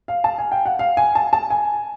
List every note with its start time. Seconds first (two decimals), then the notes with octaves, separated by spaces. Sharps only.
0.08 F5
0.24 A5
0.38 G#5
0.52 G5
0.66 F#5
0.79 F5
0.97 G#5
1.15 A5
1.33 A5
1.50 G#5